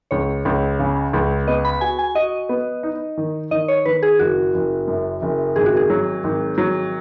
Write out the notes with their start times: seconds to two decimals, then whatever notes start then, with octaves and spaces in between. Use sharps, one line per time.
0.11 C#2 C#5
0.45 C#2
0.79 C#3
1.13 C#2
1.47 B3 D#5
1.65 B5
1.81 F#4 G#5
1.98 G#5
2.15 F#4 D#5
2.49 B3
2.83 D#4
3.17 D#3
3.51 D#3 D#5
3.68 C#5
3.85 D#3 B4
4.02 G#4
4.19 F#1 F#4
4.54 F#1
4.87 F#2
5.22 F#1
5.56 G#1 G#4
5.66 F#4
5.77 G#4
5.90 F#3
6.24 G#1
6.58 F#3